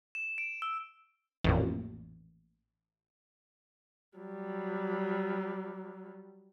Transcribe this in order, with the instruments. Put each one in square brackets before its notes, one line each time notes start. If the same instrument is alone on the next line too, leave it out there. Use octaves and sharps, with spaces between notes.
[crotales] E7
D7
E6
[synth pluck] A1 F2 A#2
[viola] F#3 G3